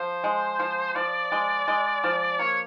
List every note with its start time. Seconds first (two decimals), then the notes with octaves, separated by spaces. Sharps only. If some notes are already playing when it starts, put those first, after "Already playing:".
Already playing: F3 C5
0.24 G#3
0.59 F3
0.95 F3 D5
1.32 G#3
1.68 G#3
2.04 F3
2.39 A#3 C#5